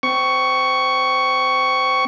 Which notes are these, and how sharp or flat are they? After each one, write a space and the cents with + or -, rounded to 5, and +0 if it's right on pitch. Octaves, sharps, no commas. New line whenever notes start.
C4 -25 C#6 +10